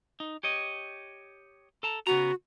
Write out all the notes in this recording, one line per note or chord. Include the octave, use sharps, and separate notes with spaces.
D#4
G4 C#5 D#5
A4 A5 A#5
C#3 B3 F#4 A#5